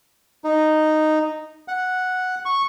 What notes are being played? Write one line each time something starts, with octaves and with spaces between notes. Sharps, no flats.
D#4
F#5
C#6